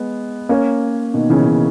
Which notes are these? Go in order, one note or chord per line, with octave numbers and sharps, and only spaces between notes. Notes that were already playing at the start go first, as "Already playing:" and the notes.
Already playing: G#3 B3
A#3 C#4
B2 D#3
C#3 E3
C#3